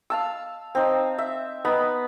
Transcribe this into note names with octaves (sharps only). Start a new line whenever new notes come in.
F5 A5 E6
C4 D#4
E5
B3 D#4 B5